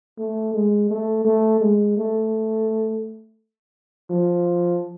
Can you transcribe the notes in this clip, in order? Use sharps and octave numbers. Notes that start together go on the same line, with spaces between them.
A3
G#3
A3
A3
G#3
A3
F3